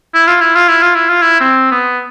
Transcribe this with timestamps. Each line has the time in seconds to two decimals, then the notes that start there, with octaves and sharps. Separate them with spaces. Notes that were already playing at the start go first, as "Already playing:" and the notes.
0.14 E4
0.28 F4
0.41 E4
0.55 F4
0.68 E4
0.82 F4
0.95 E4
1.09 F4
1.22 E4
1.41 C4
1.72 B3